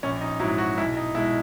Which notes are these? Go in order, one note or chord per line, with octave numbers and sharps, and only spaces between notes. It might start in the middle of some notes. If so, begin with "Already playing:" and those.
A#1 C#4
D#4
G#2 F#3 E4
F#4
B1 E4
D#4
B2 G#3 E4